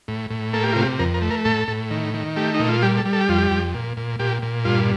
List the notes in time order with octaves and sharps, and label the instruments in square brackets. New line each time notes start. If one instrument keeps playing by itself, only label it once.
[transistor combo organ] A2
A2
A#3 A4
G4
C3 F4
G4
F2 A#4
A#4
A3
A#4
A2 A4
A2
D#3
D#3
A3 G4
D#4
A#2
F4
G3 G4
A4
G3
A4
G4
F2 F4
G4
F2
A#2
A#2
A#2 G4
A#2
G2 F4